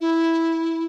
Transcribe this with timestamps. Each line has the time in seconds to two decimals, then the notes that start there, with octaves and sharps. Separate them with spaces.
0.01 E4